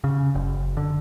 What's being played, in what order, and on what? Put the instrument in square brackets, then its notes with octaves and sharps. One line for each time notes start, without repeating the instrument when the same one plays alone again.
[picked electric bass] C#3
F#1
D3